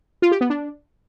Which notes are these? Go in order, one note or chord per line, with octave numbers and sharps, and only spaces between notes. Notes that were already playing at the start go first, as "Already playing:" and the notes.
F4
G4
B3
D4